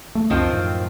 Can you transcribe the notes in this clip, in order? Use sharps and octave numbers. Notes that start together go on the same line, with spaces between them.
A3
C#2 F#2 D#3 F3 C4 D4
F#2 A2